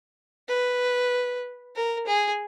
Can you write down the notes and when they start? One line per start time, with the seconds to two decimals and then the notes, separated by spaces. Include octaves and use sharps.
0.48 B4
1.75 A#4
2.06 G#4